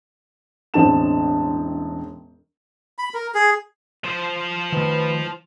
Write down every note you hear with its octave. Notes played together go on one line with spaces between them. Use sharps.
E1 A1 D3 C4 A5 E7
B5
A#4
G#4
F3 C5
D#3 A3 B4